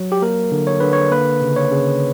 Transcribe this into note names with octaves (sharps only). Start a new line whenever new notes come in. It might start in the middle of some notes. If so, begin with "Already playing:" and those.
Already playing: F#3
G4
A#3 A#4
D3
C#5
D3 B4
C#5
A#3 B4
C#3
C#5
C#3